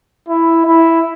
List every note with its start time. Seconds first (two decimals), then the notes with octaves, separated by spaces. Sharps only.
0.28 E4
0.66 E4